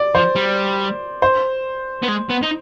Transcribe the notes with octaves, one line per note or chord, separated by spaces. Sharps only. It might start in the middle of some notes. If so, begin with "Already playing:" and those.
Already playing: D5
F3 C5
G3
C5
B3
G#3
B3
D#4